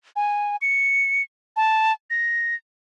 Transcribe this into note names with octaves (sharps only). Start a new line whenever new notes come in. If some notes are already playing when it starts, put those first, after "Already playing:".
G#5
C#7
A5
A#6